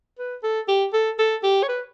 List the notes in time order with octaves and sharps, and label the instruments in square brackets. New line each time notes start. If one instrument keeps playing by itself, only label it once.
[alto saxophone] B4
A4
G4
A4
A4
G4
C#5
B4